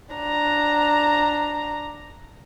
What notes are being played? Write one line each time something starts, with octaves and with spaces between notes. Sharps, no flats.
D4 A#5